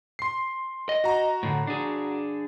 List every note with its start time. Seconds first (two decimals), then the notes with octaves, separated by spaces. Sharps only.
0.19 C6 C7
0.89 D#5
1.04 F#4 A#5
1.43 A2 D3
1.67 D4 G#4